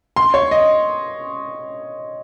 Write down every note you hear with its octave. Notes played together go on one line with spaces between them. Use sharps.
C6
C#5
D#5